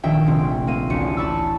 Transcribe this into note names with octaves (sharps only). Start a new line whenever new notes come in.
A#1 D#3 E5 G5
F1 C4 D7
A#3 C4 D#7
A1 D2 C#7
A5 B5 C#6 D6 E6